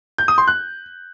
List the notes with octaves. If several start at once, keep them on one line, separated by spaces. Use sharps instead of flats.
G6
D#6
C6
F#6